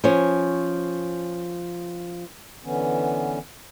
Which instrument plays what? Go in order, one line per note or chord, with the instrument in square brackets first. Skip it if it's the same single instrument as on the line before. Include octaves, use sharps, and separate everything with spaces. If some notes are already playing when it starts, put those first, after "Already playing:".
[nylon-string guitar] F3 C#4 C#5
[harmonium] D3 E3 B3 C#4